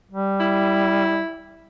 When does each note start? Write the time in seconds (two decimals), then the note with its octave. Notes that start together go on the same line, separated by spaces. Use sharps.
0.11 G3
0.40 E4